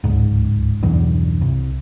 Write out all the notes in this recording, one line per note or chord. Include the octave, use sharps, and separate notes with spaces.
D1 C#2 G#2
B1 E2 G2
C2